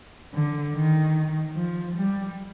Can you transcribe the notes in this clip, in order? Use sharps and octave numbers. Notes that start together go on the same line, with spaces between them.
D3
D#3
F3
G3